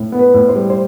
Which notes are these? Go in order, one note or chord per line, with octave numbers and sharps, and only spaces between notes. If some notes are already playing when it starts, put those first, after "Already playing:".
Already playing: A2
B3
B4
A2
C5
G3
C5